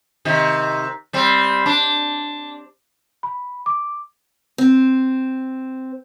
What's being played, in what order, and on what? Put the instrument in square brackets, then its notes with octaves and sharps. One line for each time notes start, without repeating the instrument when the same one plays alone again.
[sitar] C3 D#3
G3 C4
D4
[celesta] B5
D6
[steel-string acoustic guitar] C4